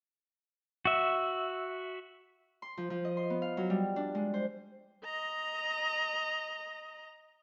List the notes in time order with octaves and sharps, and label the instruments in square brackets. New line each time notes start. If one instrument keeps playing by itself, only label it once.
[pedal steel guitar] F#4 E5
[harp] C6
F3
F3
D#5
C6
B3
F5
F#3
G3
D4
G#3
C5
[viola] D#5 A#5